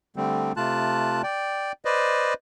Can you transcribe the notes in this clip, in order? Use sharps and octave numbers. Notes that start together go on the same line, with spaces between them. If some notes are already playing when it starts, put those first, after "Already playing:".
D3 G3 A3 C4
C3 A3 F4 A5 F#6
D5 G5
B4 C5 D5 D#5